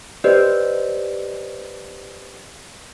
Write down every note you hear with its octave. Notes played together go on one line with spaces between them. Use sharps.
G4 B4 C5 D5 D#5